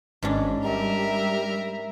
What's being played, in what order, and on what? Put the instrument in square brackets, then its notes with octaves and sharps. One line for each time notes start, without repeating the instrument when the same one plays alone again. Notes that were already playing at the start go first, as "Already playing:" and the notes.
[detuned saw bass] G#1 [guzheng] G#2 C#4 D4
[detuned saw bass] G3 [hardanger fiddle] A#4 [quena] E5